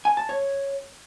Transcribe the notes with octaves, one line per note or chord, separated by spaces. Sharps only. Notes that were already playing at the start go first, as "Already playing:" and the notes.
G#5
A5
C#5